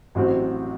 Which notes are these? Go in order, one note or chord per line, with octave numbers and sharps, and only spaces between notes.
A1 A2 F#3 C4 F#4